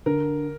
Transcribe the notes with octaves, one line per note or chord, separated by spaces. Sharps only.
D3 A#4